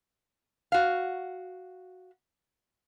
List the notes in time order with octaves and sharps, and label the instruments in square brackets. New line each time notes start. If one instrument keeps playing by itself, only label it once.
[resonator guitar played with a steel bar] F#4 F5